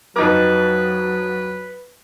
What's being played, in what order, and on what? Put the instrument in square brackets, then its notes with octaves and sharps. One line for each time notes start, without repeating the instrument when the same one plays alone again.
[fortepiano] F2 D#4 D6 [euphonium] F#3 [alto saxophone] B4